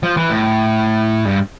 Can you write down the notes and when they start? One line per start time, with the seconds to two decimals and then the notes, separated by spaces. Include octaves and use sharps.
0.03 F3
0.17 E3
0.30 A2
1.25 G2